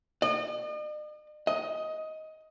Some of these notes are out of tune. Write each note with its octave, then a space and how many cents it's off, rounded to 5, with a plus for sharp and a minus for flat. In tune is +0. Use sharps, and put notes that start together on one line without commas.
D#5 -45
D#5 +15